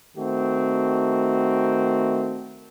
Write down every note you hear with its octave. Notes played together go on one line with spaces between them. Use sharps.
D#3 A3 C4 F#4